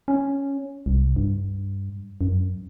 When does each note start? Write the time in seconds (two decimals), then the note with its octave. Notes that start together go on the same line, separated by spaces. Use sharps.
0.08 C#4
0.86 C2
1.16 G2
2.21 F#2